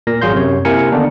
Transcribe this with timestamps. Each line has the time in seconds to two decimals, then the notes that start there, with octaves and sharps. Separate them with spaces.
0.07 A#2 A#4 A#6
0.21 G#1 F#3 G#4 F5 C6 G6
0.33 F#2 C3 C#5
0.65 C3 A#3 E4 A#4 G#5 C#7
0.92 D3 D#3 A#3 B3 D4 D#4